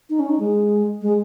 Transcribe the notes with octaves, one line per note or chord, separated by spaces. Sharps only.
D#4
C#4
D#4
G#3
G#3